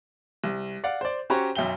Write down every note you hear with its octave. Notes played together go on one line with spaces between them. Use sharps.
C2
D5 F5 F#5
C5 D5
C#4 F#4 G4 C5 C#5 A#5
B1 F#2 E5 G5 G7